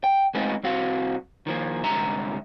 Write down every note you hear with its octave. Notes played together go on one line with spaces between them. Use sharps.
G5
G#3 A3 B3 C4 D#4 F4
C2 C4 F#4 F5
D#3 F3 A#3
C2 G#2 D3 E5 A#5